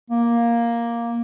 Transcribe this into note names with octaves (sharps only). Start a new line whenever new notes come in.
A#3